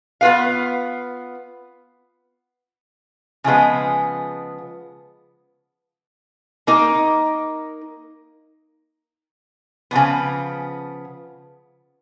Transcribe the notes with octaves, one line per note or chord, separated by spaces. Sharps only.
B3 F4 B4 F5
C#3 F3 G#3 B3
A#3 D#4 A#4 D#5
C#3 F3 B3